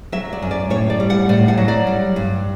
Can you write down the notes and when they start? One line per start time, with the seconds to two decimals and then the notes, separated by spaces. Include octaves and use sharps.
0.12 F#3 E5
0.33 D5
0.42 F#2
0.51 D5
0.70 A2 C#5
0.90 D5
1.00 G3
1.10 F#5
1.29 A2 D5
1.48 F#5
1.58 F#3
1.68 D5
1.87 G3
2.16 G2